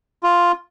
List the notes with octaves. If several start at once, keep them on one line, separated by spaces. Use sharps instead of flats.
F4